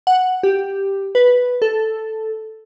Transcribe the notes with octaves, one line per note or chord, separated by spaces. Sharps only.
F#5
G4
B4
A4